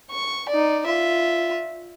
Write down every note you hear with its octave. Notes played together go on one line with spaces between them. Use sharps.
C#6
D#4 D5
F4 E5